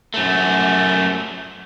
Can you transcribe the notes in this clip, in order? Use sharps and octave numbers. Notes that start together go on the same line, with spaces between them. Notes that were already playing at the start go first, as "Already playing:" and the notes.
F#2 A3